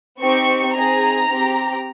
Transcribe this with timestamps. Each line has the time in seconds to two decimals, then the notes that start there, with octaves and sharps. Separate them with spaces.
0.20 C4 D#4 G4 C#6
0.75 C4 D#4 G#4 A#5
1.29 C4 G4